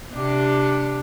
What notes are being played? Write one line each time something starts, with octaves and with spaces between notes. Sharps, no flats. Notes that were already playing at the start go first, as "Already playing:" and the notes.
C3 D4 G4